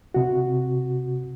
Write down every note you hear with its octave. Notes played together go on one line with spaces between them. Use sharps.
C3 F#4